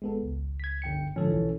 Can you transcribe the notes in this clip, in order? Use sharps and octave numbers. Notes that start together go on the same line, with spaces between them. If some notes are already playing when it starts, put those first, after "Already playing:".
G#1 G#3 B3 A4
C#2
G#6 B6
G1 G5 C#7
G#2 D3 F3 C#4 A4
B1 E3